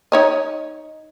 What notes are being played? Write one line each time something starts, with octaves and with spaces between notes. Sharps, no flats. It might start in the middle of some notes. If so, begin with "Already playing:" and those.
D#4 C#5 D#5